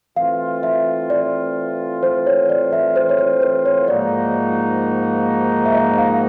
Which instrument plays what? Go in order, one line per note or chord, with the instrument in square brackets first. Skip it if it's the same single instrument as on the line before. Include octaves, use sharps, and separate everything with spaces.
[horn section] E3 A3 C4 F4 [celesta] F5
[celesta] E5
D5
C5
C#5
D5
E5
C5
C#5
C5
B4
C#5
[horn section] G#2 F3 A#3 D#4 F#4 [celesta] D5
[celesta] E5
D#5
F5